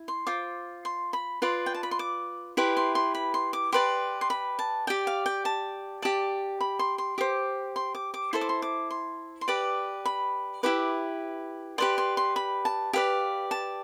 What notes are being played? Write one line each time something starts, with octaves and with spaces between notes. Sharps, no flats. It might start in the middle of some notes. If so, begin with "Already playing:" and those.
Already playing: E4
C6
F4 C5 D6
C6
B5
F4 B4 D5 C6
G5
A5
B5
C6
D6
E4 G4 B4 C6
C6
C6
B5
C6
D6
G4 B4 D5 C6
C6
B5
A5
G4 D5 G5
F5
G5
A5
G4 D5 A5
B5
C6
C6
G4 C5 D6
C6
D6
D6
E4 A4 C5 C6
D6
C6
D6
C6
C6
G4 B4 D5 D6
B5
E4 G4 B4 D6
G4 B4 D5 C6
C6
C6
B5
A5
G4 B4 D5 F5
A5